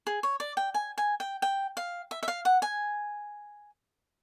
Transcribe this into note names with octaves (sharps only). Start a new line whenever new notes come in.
G#4
C#5
D5
G5
G#5
G#5
G5
G5
F5
E5
E5
F5
F#5
G#5